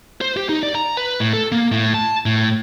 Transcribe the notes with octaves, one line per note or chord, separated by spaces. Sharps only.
C5
G4
D#4
D5
A#5
B4
A2
A4
A#3
A2
A5
A2